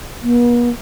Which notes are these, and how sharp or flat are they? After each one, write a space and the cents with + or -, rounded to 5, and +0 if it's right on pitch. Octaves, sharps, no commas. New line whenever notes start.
B3 -45